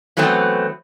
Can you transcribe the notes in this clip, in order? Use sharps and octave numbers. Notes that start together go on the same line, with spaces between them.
E3 F#3 A3 B3 C4